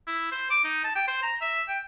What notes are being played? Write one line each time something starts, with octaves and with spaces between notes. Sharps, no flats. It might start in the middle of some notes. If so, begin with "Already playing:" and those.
E4
C5
D6
D#4
A5
G5
C5
A#5
E5
G5